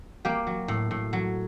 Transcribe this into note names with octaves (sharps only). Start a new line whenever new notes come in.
A#3 G4
F#3
A2
A2
F#3